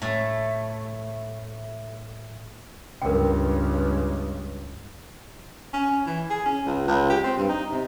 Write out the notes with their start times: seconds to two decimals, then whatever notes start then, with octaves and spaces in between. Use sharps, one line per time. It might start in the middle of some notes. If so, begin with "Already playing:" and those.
0.02 A2 A3
3.02 C#2 G2 A#4 G5
5.73 C#4
6.06 E3
6.30 G#4
6.46 C#4
6.66 C#2
6.88 C#2
7.10 G4
7.24 C4
7.38 G2
7.49 D#4
7.72 C3